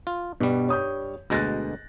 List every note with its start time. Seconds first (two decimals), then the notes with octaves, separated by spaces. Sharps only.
0.07 F4
0.41 G2 B2 G3
0.68 C#5 D#6 G6
1.30 D2 B2 G#3 F#6 A6 A#6